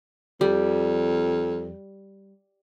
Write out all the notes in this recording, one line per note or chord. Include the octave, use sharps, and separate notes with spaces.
F2 G3